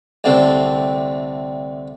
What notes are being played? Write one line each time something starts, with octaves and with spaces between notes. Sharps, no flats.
C2 D3 A3 C4